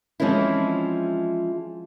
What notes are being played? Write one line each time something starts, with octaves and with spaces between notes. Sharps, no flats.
E3 F3 G#3 C4 C#4 E4